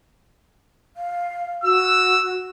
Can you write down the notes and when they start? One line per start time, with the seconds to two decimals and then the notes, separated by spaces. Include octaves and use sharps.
0.97 F5
1.64 F#4 E6